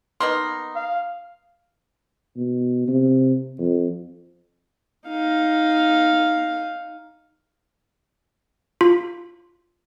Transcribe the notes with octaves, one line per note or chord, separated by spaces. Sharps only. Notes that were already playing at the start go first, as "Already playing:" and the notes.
A#3 B3 D#4 C6
F5
B2
C3
F2
D#4 F5
F4